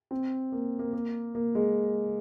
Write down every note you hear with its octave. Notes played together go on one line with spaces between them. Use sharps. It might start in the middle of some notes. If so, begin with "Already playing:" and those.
C4
A#3
A#3
A#3
A#3
G#3